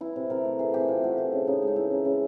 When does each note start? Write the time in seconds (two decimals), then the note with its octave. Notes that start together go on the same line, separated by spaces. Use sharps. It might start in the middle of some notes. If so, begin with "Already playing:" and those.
0.01 E3 E4
0.16 C3
0.30 C3 A#4
0.45 A3
0.59 E3 G#4
0.74 C3 G4
0.88 C3 F4
1.04 A3 F#4
1.17 E3 G4
1.33 C#3
1.47 C#3 D#4
1.62 G#3 D#4
1.76 E3 E4
1.91 C#3
2.05 C#3